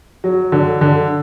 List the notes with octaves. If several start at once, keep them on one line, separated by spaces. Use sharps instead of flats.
F#3
D3
D3